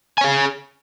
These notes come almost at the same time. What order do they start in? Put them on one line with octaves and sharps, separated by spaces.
G#5 C#5 G#4